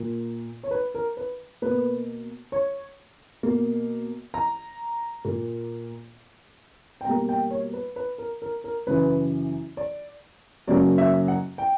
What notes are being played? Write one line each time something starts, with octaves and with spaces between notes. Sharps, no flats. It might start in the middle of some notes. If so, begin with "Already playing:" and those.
Already playing: A#2 A#3
C#5
B4
A#4
B4
B2 A#3 B4
C#5
B2 A#3
A#5
A#2 A#3
G5
B2 G3 A#3 A#5
G5
C#5
B4
B4
A#4
A#4
A#4
F#2 C#3 E3 B4
D5
F#2 C#3 F#3 A#3 D5
E5
F#5
G5